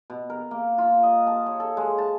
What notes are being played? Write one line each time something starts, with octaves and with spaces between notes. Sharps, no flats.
B2
A#4
A#3
F4
D#5
A5
C#5
A4
G#3
A5